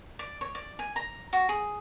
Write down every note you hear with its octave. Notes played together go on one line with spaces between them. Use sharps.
D5
C#5
D5
G#5
A#5
F#4
G#4